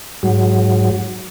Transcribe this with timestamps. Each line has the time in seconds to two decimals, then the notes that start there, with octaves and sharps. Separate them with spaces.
0.23 G#2 F#3